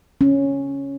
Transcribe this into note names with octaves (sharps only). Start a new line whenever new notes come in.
C#4